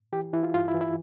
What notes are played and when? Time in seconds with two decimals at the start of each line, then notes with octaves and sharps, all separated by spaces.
0.12 E3 G4
0.33 E3 E4
0.43 F4
0.54 G2 F4
0.68 E4
0.74 E3
0.81 E4